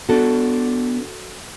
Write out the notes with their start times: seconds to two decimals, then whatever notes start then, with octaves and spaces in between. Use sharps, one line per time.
0.09 B3 D4 F#4 A4